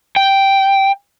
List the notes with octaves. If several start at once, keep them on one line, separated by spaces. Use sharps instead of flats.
G5